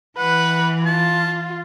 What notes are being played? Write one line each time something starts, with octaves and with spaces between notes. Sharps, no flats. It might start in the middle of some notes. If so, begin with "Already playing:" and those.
E3 B4 F#5
F4 A5